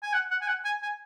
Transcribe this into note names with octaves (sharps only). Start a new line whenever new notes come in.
G#5
F#5
F#5
G#5
F#5
G#5
G#5